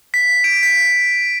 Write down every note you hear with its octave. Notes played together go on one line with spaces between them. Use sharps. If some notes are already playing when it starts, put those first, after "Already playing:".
B6
D7
B6